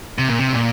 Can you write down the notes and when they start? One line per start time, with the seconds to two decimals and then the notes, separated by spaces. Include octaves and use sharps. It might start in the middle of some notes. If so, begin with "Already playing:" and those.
0.18 C3
0.29 A#2
0.39 C3
0.53 A#2